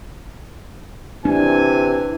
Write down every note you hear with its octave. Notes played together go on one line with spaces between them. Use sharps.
C3 E3 D4 G#5